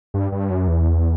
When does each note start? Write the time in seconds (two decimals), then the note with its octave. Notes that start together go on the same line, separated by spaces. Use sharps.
0.14 G2
0.32 G2
0.50 F#2
0.68 E2